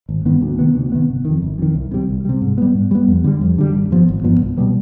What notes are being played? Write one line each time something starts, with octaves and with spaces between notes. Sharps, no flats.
G#1
G2 D#3 B3
D2
C3 D#3 B3
D2
C3 D#3 B3
G1
F2 D#3
G1
F2 D#3
C2
C3 G3
C2
C3 G3
G#2
G3 B3
G#2
G3 B3
F2
D3 G3
F2
D3 G3
G#1
G2 F3 B3
G#1
G2 F3 B3
C2
B2 G3 B3